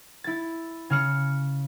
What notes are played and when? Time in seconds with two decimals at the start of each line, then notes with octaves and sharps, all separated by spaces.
0.24 E4 A6
0.90 C#3 F6 C#7